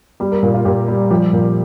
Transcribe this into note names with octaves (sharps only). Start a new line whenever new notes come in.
G3 G4
A#4
A#2
F4
A#2 G4
G3
F3 G4
A#2